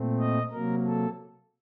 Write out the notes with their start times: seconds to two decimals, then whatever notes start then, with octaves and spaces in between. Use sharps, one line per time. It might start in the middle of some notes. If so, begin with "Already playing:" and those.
Already playing: A#2 A3 C4
0.20 D#5
0.52 C3 F#3 A#3 A#4
0.86 A4